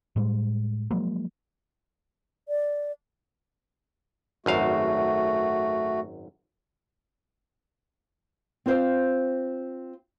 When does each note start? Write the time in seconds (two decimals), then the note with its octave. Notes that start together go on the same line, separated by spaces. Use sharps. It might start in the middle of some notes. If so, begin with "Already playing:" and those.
0.16 A2 G3 G#3
0.91 F3 F#3 G#3 A#3
2.48 D5
4.46 G#1 F#2 A3 F#4 F5
8.66 C4 F4 C5 F5